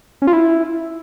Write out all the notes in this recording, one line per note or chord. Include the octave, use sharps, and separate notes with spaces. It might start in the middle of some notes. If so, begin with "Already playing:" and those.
C#4
F4
E4